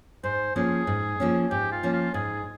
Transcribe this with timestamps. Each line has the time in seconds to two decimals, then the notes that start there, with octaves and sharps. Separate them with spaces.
0.24 G#2 C5
0.55 F3 A#3 C#4 G#4
0.87 G#2
1.20 F3 A#3 C#4
1.51 G#2 G4
1.72 F4
1.83 F3 A#3 C#4
1.93 F4
2.14 G#2 G#4